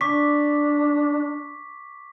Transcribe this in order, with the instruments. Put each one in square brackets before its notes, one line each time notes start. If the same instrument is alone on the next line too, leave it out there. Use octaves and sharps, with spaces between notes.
[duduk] D4 [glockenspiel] C#6 D6 B6